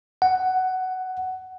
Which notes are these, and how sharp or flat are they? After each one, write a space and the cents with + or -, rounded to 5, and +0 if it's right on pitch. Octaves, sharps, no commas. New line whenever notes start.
F#5 +10